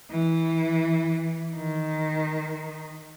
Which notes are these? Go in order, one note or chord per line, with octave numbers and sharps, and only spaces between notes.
E3
D#3